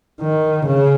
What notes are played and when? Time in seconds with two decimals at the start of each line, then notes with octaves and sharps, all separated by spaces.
0.21 D#3
0.67 C#3